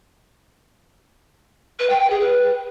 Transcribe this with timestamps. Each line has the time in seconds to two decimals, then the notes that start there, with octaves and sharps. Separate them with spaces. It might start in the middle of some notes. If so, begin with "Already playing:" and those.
1.79 B4
1.89 G5
1.99 G5
2.10 G#4
2.20 B4